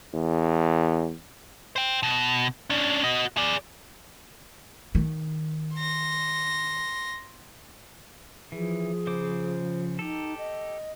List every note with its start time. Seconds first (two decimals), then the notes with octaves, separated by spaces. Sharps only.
0.14 E2
1.76 C5 G5
2.03 B2
2.70 C#4 D4
3.03 F#4 D#5
3.37 G#4 D5
4.95 D#3
5.76 C6 A#6
8.52 E3 F3 G#4
9.07 C#3 C5 D6
9.99 D#4 G4 A4
10.38 D#5